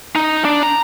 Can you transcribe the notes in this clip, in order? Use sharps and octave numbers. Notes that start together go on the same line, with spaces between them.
D#4
D4
A#5